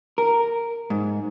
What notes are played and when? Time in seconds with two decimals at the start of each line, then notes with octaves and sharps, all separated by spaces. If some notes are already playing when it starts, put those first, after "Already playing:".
0.18 A#4
0.90 G#2